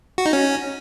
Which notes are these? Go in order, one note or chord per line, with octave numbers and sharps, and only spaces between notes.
F#4
D#4
C#4